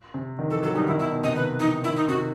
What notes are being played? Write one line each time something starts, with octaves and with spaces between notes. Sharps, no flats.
C3
D#3
E3 A4
F#3 A4
G3 D#4
D#3 E4
B2 E4
B2
C3 D#5
D#3 B4
E3 D#4
D#3 E4
D#4
C3 F#4